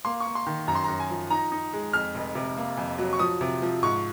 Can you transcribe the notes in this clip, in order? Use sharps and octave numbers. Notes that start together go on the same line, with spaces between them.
A#3 C6
C#6
A#3
C6
D#3
F#2 A#5
C6
A#5
F#2
G#5
F3
D#4 A#5
D#4
G#3
F2 F6
F1
C3
A#3
F2
F#3
C#6
F3 D#6
C3
F3
G#2 C#6